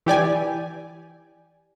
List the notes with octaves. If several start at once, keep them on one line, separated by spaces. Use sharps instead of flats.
E3 G4 D5 G#5